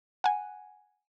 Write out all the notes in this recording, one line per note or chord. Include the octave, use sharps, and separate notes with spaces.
F#5 G#5